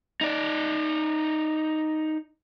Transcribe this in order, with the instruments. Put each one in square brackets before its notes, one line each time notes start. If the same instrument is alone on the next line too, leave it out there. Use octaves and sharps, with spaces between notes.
[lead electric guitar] D#4 D5